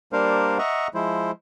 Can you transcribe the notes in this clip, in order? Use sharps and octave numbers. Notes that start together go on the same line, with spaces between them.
G3 A#3 D4 A#4 C5 F5
D#5 E5 F#5 A#5 C#6
F3 G#3 E4 C5